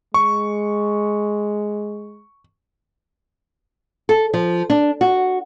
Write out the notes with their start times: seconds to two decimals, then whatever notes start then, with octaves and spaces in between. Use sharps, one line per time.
0.14 G#3 C#6
4.09 A4
4.34 F3
4.70 D4
5.01 F#4